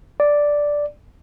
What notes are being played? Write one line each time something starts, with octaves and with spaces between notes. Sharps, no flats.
D5